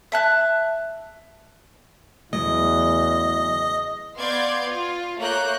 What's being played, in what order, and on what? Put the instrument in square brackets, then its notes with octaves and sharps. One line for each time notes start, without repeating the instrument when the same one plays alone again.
[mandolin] E5 A5 F#6
[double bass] E2 [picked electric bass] C#3 F#3 A3 [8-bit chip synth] D#5
[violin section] B3 D5 F5 C6 G6 G#6
F4
A3 A#3 A#4 C#5 F#6 G6